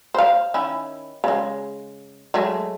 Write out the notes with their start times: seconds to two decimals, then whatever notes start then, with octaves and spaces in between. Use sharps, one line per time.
0.14 C5 F5
0.54 D#3 C#4 E4
1.24 C#3 G#3
2.34 F#3 G#3 A3